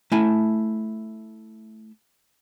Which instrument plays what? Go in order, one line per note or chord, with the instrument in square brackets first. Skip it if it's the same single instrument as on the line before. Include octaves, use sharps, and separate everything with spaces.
[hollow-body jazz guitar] A3 E4 G#5